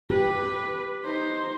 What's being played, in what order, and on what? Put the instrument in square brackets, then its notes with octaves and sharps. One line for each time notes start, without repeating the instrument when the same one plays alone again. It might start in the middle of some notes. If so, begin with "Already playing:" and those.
[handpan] G4 [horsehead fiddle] B4
[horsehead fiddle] D#4 C5